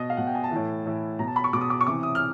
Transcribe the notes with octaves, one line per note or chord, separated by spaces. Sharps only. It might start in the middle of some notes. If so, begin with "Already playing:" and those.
Already playing: B2 D#5
F5
B2 F#5
G5
G#5
A5
A2 E3
A2 E3
B2 A#5
A5
B5
C#6
B2 D6
D#6
D6
C#6
C3 E3 D6
D#6
F6